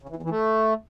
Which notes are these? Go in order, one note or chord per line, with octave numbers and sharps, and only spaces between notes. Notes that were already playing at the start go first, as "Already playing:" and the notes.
C#3
E3
E2
E3
A3